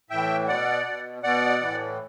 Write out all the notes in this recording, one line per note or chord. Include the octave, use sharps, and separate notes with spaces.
A2 E3 E5 G5
B2 D5 F#5
B2
B2 D5 F#5
A2 E3